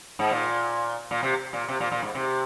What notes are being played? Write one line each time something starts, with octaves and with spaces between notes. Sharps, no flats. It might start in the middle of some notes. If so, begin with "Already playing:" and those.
G#2
A#2
A#2
C3
A#2
C3
A#2
A#2
G#2
C3